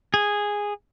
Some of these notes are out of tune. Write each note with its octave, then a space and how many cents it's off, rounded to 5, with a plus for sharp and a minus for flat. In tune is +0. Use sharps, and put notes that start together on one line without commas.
G#4 -10